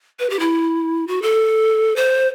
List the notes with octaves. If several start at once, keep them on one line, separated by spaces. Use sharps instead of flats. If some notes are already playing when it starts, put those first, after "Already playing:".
B4
G4
E4
F#4
A4
C5